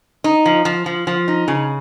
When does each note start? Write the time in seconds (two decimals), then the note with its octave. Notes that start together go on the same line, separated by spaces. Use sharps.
0.24 D#4
0.46 F3
0.65 F3
0.86 F3
1.07 F3
1.28 D#4
1.48 C#3